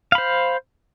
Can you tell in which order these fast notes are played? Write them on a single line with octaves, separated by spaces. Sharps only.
F5 B5 C5